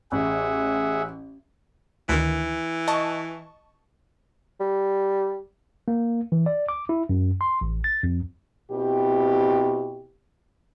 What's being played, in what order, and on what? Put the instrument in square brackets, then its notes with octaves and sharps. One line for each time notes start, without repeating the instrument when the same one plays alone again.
[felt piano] A1 [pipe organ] G#4 E5 F#5
[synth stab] D2 D#3 [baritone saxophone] E3
[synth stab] D#5 A5 C#6
[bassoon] G3
[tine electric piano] A#3
E3
D5
D6
E4
F#2
C6
A1
A6
F2
[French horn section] B2 C4 E4 G4